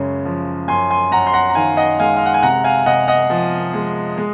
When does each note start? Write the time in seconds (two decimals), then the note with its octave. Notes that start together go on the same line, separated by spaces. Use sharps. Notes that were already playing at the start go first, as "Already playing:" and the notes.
Already playing: F#2 C#3 G#3
0.25 F3
0.68 F#2 G#5 C6
0.91 G#5 C6
1.12 F#2 F#5 A#5
1.27 C6
1.33 F#5 A#5
1.50 A#5
1.55 D#3 F5 G#5
1.77 D#5 F#5
1.99 G#3 F5 G#5
2.16 F5
2.26 F#5
2.34 G#5
2.42 C3 F#5 A#5
2.64 F5 G#5
2.86 C3 D#5 F#5
3.08 D#5 F#5
3.30 F3
3.73 G#3
4.17 G#3